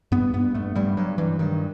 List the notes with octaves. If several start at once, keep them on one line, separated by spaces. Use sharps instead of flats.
G2 B3
G2 B3
G2 A3
G2 G3
G2 F#3
G2 E3
G2 D#3